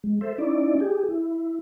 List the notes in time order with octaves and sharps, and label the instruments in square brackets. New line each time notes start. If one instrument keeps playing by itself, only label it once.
[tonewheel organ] G#3
A4 C5 E5
C#4 D#4 E4 D5
G4 G#4
E4